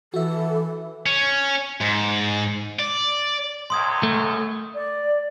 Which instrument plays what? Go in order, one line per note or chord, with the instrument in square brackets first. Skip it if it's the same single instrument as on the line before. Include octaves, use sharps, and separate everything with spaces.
[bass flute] E3 [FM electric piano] F#4 E5 [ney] A4
[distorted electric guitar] C#4
G#2
D5
[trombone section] C#2 F#2 [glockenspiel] C6 D#6 G#6
[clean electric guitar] A3
[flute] D5